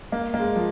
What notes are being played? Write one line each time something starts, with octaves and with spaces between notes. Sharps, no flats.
A#3
A#3
G#3
F3